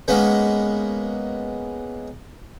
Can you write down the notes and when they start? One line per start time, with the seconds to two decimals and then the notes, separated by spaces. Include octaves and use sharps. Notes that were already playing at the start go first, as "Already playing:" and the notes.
0.08 G#3 A#3 B3 C#4